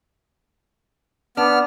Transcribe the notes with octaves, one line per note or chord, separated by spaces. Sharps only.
B3 D4 F6